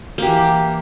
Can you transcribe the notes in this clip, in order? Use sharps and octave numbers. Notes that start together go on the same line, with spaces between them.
E3 A#3 G4